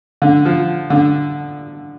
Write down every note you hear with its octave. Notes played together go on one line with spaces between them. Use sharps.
D3
F3
D3